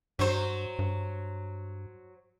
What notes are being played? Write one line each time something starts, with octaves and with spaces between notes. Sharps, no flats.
G2 F#3 C5
G2